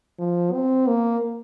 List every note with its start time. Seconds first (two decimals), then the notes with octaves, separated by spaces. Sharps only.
0.19 F3
0.53 C4
0.88 A#3